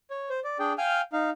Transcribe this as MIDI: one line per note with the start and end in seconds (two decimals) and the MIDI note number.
0.11 0.29 73
0.30 0.40 72
0.44 0.58 74
0.59 0.73 62
0.59 0.73 68
0.59 0.73 79
0.78 1.01 77
0.78 1.01 79
0.78 1.01 80
0.78 1.01 89
0.78 1.01 91
1.13 1.30 63
1.13 1.30 77